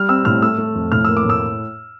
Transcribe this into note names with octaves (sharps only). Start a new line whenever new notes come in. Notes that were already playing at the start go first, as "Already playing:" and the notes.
Already playing: G3 F6
C4 E6
A2 F6
A3 E6
A3
F2
A2 F6
A#3 E6
D6
A2 E6